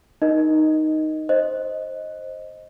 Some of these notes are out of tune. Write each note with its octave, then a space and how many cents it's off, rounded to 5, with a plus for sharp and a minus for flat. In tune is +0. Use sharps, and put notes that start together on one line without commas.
D#4 +0 A#4 +30 D#5 +0
C5 +15 D#5 +0